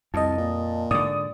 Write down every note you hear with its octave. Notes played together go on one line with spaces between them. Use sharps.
C2 F2 D#5 A5
A#2
G#2 D3 D5 D#6